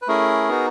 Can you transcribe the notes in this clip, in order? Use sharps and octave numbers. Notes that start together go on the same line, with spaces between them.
B4
A3 C#4 E4 G#4 A#4
B3 D#4 F#4